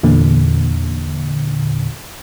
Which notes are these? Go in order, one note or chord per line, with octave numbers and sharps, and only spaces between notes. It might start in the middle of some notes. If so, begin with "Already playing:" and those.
E2 A#2 D3